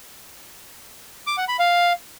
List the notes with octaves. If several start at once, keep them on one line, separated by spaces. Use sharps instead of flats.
D6
F#5
B5
F5